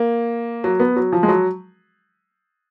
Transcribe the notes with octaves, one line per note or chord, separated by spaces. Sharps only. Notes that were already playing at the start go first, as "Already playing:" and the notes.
Already playing: A#3
F#3
B3
F#3
F3
G#3
F#3